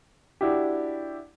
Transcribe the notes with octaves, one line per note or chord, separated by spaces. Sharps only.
D4 E4 F#4 G4